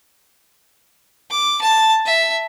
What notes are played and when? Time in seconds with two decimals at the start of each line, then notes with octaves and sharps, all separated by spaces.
1.30 D6
1.62 A5
2.06 E5